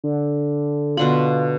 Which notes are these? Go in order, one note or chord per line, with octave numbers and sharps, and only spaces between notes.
D3
B2 D3 F4 B5